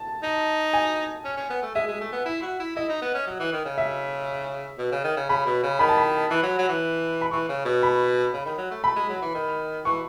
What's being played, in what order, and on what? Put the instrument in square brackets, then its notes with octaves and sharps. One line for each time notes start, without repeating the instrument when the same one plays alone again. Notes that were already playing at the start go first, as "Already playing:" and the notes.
Already playing: [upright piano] A5
[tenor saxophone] D#4
[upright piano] G#5
[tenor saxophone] C#4
C#4
B3
A3
[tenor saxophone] G#3 [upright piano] E5
[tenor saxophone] G#3
A3
B3
E4
F#4
E4
[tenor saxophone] E4 [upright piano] D#5
[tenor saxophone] D#4
B3
C#4
F#3
E3
D#3
C#3
[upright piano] E5
[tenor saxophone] B2
C#3
D#3
C#3
[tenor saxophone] C#3 [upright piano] B5
[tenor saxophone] B2
C#3
[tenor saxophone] D#3 [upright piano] B5
[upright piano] A5
B5
[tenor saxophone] E3
F#3
F#3
E3
[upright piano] B5
[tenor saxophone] E3 [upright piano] C#6
[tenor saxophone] C#3
B2
[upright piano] B5
[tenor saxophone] C#3
D#3
F#3
A3
[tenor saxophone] A3 [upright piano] B5
[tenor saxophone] G#3
F#3
E3
D#3
[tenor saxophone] E3 [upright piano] C#6